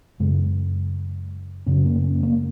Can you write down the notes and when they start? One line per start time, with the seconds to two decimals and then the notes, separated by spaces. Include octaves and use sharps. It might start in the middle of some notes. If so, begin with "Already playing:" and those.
0.20 F#2 C#3 G#3
1.66 F#2 C#3 C#4
1.85 A#3
2.04 C#4
2.23 A#3